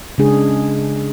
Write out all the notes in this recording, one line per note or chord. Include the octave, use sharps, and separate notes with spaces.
C#3 G#3 D4 G#4